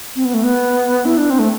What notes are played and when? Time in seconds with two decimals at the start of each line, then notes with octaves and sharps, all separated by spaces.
0.16 C4
0.25 B3
0.34 A3
0.43 B3
1.05 E4
1.18 D4
1.30 C4
1.39 A3